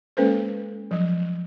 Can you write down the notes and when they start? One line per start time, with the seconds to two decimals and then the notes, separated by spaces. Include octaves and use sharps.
0.17 G#3 A#3 C#4 A4 B4 C5
0.91 F3 F#3